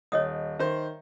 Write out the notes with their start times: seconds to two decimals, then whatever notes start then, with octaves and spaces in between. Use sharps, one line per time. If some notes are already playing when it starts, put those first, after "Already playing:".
0.12 D#1 C#5 D#5 D#6
0.59 D#3 C5 E5